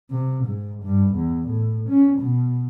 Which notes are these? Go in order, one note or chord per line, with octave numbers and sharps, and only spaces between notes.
C3
G#2
G2
E2
A2
C#4
B2